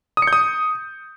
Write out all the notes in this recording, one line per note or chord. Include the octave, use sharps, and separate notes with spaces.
D#6
C#7
G6
D#6